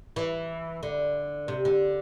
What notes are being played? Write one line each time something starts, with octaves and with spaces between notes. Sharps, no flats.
E3
D3
C3
D3